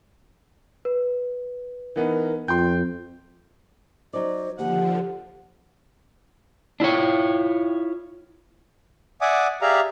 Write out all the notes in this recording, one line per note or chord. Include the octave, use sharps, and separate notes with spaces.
B4
E3 B3 D#4 A#4
F2 F4 G5 C6 G6
F#3 D#4 C5 D5
D#2 D3 F3 G4 F#5
D4 E4 F4 C#5
D5 E5 F#5 G#5 D6 D#6
G4 G#4 D5 E5 F5 A#5